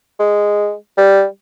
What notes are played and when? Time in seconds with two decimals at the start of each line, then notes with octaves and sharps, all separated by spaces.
0.19 G#3
0.98 G3